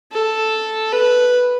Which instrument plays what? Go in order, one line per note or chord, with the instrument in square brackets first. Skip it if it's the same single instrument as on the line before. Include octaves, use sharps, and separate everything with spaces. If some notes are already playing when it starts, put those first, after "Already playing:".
[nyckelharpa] A4
B4